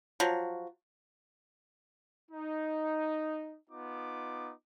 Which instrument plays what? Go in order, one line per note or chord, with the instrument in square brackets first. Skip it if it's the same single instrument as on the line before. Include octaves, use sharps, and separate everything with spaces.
[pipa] F3 F#3
[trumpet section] D#4
B3 D#4 F4 D6